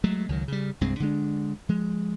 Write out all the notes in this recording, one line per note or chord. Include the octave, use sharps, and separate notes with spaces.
F#3 G#3 A3
C#2 D#3 F#3
C#3 G3
C2 G2 G#3 C4
D3 G#3 D4
F3 G#3